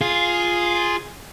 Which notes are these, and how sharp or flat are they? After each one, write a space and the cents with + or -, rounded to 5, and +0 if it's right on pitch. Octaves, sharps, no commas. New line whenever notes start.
F4 +0 G#4 +0